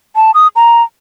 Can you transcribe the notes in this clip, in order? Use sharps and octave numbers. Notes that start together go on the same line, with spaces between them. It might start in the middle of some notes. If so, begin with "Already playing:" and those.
A5
D#6
A#5